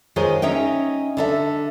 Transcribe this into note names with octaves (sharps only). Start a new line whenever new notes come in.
D#3 G#3 F4 G#4 C5 C#5
C#4 D#4 E5 G5
D3 A4 E5